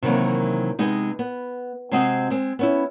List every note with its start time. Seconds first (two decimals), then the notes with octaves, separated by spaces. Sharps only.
0.02 C3 D#3 E3 F#3 A#3
0.79 C3 G#3 B3 D#4
1.19 B3
1.91 C3 G#3 C4 F#4 D#5
2.30 G#3 C4
2.59 B3 C#4 E4